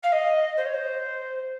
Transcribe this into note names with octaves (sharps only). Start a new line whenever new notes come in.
F5
D#5
C5
C#5
C5